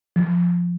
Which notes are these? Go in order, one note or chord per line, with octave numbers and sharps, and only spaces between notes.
F3